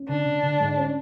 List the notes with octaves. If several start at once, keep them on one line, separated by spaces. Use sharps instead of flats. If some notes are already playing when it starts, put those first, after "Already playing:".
Already playing: C#4
D3 D4
D3
D3
G#2
C#4